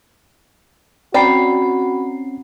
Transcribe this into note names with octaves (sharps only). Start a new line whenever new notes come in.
C4 C#4 F#4 D5 G5 A#5 B5 C7